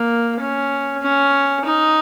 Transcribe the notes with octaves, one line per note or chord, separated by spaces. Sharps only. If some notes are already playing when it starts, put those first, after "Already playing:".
Already playing: A#3
C#4
C#4
D#4